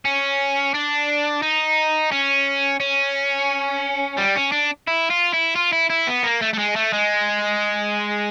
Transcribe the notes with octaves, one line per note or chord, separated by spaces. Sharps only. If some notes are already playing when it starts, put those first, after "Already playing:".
C#4
D4
D#4
C#4
C#4
G3
C#4
D4
E4
F4
E4
F4
E4
E4
B3
A#3
A3
A3
G#3
A3
G#3